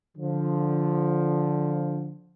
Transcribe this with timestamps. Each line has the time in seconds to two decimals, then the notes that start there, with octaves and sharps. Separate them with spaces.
0.17 D3 F3